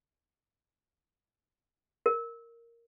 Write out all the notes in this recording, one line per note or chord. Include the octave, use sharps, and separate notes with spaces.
A#4